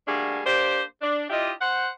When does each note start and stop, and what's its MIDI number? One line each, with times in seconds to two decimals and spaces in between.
0.08 0.40 55
0.08 0.40 57
0.08 0.40 58
0.08 0.40 62
0.08 0.40 66
0.08 0.40 68
0.46 0.82 58
0.46 0.82 62
0.46 0.82 67
0.46 0.82 72
1.01 1.26 62
1.30 1.51 62
1.30 1.51 64
1.30 1.51 65
1.30 1.51 67
1.30 1.51 75
1.61 1.88 72
1.61 1.88 78